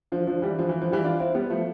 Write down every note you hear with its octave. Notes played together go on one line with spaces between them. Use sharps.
D3 F3
D3 F3
E3 G3
D3 F3
E3
D3 F3
E3 G3
D4 F4
C4 E4
G3 B3
F3 A3